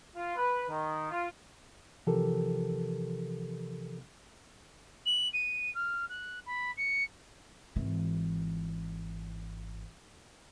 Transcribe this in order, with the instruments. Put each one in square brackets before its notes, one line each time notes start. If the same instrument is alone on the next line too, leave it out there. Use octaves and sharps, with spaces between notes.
[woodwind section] F4
B4
D#3
F4
[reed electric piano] C3 E3 F3 G4 A4 A#4
[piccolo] F#7
D#7
F6
F#6
B5
C#7
[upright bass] G#1 E3